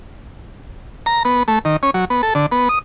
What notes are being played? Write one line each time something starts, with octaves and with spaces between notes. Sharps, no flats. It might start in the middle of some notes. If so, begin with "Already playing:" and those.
A#5
B3
A3
D#3
C#4
F#3
B3
A4
D3
B3
D#6